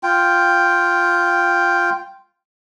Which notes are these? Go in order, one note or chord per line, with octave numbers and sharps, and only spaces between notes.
F4 G5